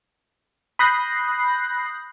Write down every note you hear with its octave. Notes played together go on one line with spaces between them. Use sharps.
B5 D#6 F#6 G6 A#6 C7